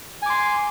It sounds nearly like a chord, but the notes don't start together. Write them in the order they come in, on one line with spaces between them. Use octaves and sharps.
G#5 D6 C6